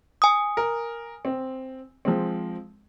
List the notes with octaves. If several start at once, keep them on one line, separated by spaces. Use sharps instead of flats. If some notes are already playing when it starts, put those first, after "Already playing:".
G#5 D#6
A#4
C4
F3 G#3 C4